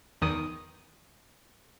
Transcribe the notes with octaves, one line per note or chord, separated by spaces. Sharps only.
E2 D#3 D#6